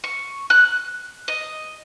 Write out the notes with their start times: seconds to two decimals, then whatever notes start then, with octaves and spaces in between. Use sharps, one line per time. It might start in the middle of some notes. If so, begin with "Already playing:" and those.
0.04 C#6
0.50 F#6
1.28 D#5